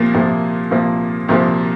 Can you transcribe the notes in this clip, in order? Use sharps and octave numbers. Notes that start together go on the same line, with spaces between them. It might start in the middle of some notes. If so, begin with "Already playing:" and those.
Already playing: C2 A#2 F3 A#3
C2 A#2 F3 A#3
C2 A#2 F3 A#3
C2 A#2 F3 A#3